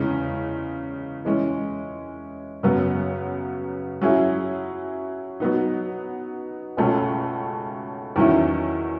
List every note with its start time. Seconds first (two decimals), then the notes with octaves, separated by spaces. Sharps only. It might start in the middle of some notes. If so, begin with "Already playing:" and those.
Already playing: E2 C#3 G#3
1.25 E3 G#3 C#4
2.63 F#2 C#3 F#3 B3
4.01 F#3 C#4 E4 G#4
5.40 F#3 B3 D#4
6.77 C#2 B2 A3 C#4
8.16 E2 D#3 F#3 C#4 E4